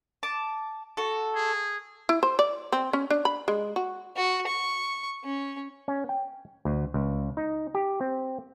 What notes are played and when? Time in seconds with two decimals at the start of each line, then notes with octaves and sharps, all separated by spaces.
0.23 A5 D6
0.97 F#4 A4
1.36 G#4
2.09 E4
2.23 C5
2.39 D5
2.72 C4
2.93 C#4
3.10 D4
3.25 B5
3.48 G#3
3.76 F#4
4.16 F#4
4.47 C#6
5.24 C#4
5.88 C#4
6.09 G5
6.65 D2
6.94 C#2
7.37 D#4
7.75 G4
8.01 C4